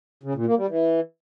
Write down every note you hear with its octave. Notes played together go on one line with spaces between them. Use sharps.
C#3
A#2
A#3
G3
E3